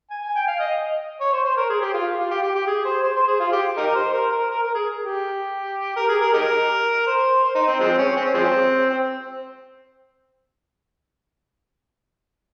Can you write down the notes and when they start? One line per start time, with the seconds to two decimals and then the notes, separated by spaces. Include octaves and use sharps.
0.10 G#5
0.22 G#5
0.35 G5
0.48 F5
0.60 D#5
1.20 C#5
1.33 C5
1.45 C5
1.57 A#4
1.69 G#4
1.81 G4
1.94 F4
2.19 F4
2.31 G4
2.43 G4
2.55 G4
2.67 G#4
2.85 C5
3.03 C5
3.16 C5
3.28 G#4
3.40 F4
3.52 G4
3.77 D#4 G4 A#4
3.95 C5
4.13 A#4
4.32 A#4
4.50 A#4
4.62 A#4
4.75 G#4
5.05 G4
5.96 A#4
6.09 G#4
6.21 A#4
6.33 D#4 G4 A#4
7.07 C5
7.43 C5
7.55 D#4
7.67 C4
7.80 F3 G#3 C4
7.98 C#4
8.16 C4
8.25 C#4
8.34 F3 G#3 C4
8.90 C4